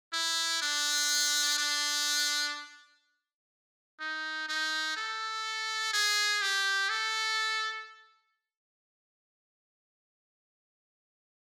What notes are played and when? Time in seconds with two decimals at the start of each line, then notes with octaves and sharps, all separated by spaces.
0.13 E4
0.62 D4
1.58 D4
4.00 D#4
4.48 D#4
4.97 A4
5.93 G#4
6.42 G4
6.90 A4